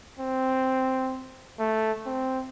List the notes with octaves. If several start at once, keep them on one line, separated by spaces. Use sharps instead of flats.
C4
A3
C4